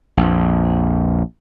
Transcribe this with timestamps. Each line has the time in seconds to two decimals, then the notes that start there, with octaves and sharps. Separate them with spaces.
0.17 A#1 F2